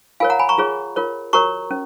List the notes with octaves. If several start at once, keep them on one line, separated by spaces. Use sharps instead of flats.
F4 A#4 C#5 F5 G#5
F#5 A#5
G#5 B5
A#5 C#6
F4 G#4 C#5
F4 A#4 C#5
F#4 A#4 C#5 A#5 C#6
C#4